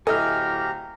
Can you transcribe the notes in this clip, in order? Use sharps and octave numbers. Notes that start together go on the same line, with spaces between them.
D1 E4 G4 A4 D#5 G#5 A#5 F6